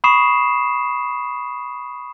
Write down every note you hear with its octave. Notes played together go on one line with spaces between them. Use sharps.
B5 C#6 D#6 C7 E7